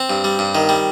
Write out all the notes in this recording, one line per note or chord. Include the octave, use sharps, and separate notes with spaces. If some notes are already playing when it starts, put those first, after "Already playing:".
Already playing: C4
G2
G3
G2
D#3
G3